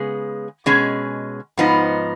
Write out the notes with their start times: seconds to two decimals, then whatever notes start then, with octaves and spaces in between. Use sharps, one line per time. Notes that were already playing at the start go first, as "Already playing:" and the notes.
Already playing: C#3 G#3 B3 G#4
0.66 B2 G#3 C#4 G#4
1.58 G#2 F3 B3 D#4